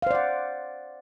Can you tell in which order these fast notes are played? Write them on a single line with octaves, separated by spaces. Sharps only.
F5 C5 D5 F#5